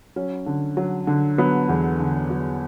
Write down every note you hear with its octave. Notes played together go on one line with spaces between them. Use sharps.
F#3 C#4
D3
F#3
D3
F#3 B3
E2
D3
F#3